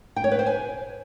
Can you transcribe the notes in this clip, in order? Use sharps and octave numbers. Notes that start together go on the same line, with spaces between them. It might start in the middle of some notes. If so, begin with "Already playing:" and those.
G5
C#5
B4
C5
G#5